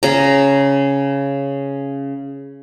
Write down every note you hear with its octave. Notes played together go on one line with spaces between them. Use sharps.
C#3 A#5